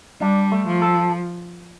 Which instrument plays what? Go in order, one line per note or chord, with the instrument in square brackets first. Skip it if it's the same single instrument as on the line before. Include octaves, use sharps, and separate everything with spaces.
[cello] G3 [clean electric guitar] D4
[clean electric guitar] A3
[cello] F3
[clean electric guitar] A4